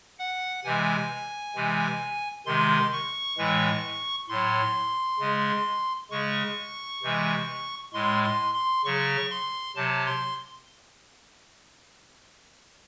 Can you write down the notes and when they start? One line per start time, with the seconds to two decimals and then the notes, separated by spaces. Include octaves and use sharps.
0.19 F#5
0.64 C3 E3 G#3 G#5
1.55 C3 E3 G#3
2.46 C3 D#3 G#3 C6
2.93 C#6
3.38 A2 E3 G#3
4.29 A2 F#3 C6
5.20 C#3 G#3
6.11 C#3 G#3 C#6
7.03 C3 E3 G#3
7.93 A2 G#3 C6
8.24 C6
8.54 C6
8.85 C#3 F#3 C#6
9.31 C6
9.76 C3 F#3 A5
10.07 C6